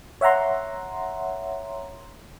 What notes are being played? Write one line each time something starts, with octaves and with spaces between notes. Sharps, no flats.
C#5 E5 F#5 A#5 C6